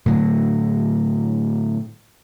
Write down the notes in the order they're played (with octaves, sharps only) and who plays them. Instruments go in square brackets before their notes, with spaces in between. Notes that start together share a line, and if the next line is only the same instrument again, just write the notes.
[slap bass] A2 D3 F#3